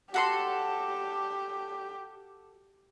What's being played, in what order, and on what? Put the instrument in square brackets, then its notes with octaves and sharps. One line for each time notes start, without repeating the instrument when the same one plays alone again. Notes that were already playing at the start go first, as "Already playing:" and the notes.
[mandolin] F#4 A4 C6 [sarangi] G4